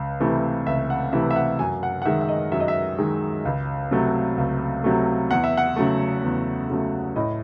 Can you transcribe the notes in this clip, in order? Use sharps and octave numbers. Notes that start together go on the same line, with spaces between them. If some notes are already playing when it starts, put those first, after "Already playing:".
Already playing: C#2
C3 E3 A3
C#2 E5
F#5
C3 E3 A3 E5
E5
F#5
F#2 G#5
F#5
F#5
D#3 G#3 E5
E5
D#5
F#2 E5
D#5
E5
D#3 G#3
C#2
C3 F#3 A3
C#2
C3 F#3 A3
E2 F#5
E5
F#5
C#3 F#3 A3
E2
C#3 F#3 A3
A2 D#5